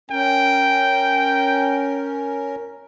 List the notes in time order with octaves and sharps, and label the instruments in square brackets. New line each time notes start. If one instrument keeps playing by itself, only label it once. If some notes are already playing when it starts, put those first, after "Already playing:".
[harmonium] C#4 A#4 [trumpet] G5